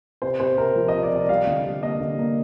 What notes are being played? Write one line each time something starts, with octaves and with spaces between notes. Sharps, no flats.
C3 C5
C3 C5
C3 A#4
F3
D#5
C3
D5
C3 D#5
G3 F5
D3
G3
A#3 D#5
D3
A#3